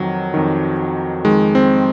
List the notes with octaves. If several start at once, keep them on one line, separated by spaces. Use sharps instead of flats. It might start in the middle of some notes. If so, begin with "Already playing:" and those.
Already playing: F2 D#3 F#3
F2 D#3
F2 D#3 G#3
C4